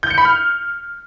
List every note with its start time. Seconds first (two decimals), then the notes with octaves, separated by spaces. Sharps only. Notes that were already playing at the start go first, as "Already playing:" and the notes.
0.03 G6
0.10 C#7
0.18 B5
0.25 F6